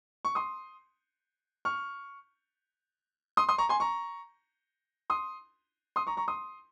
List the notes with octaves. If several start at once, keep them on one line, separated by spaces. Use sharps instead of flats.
C#6
C6 D#6
C#6 F6
C6 D#6
C6 D#6
A#5 C#6
G#5 C6
A#5 C#6
C6 D#6
C6 D#6
A#5 C#6
A#5 C#6
C6 D#6